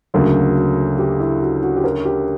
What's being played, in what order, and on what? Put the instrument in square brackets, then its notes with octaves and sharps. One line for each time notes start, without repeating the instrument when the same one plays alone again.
[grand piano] D2 C#3 F#3 A#3 [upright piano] F#4
[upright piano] F#4
G4
E4
F#4
F#4
G4
A#4
G4